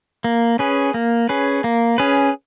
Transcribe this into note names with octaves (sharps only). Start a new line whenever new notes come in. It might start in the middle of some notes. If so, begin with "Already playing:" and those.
A#3
C#4 G#4 B4
A#3
C#4 G#4 B4
A#3
C#4 G#4 B4